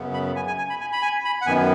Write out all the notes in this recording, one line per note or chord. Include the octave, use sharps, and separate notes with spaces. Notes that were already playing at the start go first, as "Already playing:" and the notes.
Already playing: F#2 C#3 B3
B5
G#5
G#5
G#5
B5
G#5
B5
G#5
B5
F#5
F#2 D#3 B3 G#5